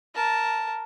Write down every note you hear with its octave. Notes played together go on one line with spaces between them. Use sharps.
A#4 A5